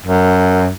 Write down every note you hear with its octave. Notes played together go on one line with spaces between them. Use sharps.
F#2